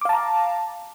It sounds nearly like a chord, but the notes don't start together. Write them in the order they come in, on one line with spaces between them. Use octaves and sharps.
D6 F5 A5 A#5